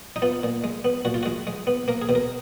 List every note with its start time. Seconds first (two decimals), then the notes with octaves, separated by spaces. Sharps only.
0.16 D#4
0.22 B3 F4
0.43 A#2
0.64 G#3
0.84 B3
1.05 A#2 F#4
1.14 F4
1.23 G#3 F#4
1.47 G#3
1.67 B3
1.88 A#3 A#4
2.02 G#4
2.09 B2
2.15 A#4